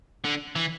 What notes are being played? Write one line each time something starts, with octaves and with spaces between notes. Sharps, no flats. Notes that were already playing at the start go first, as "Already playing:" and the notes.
D3
E3